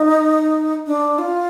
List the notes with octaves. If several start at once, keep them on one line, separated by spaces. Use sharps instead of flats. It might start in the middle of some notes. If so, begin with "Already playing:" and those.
Already playing: D#4
D4
F4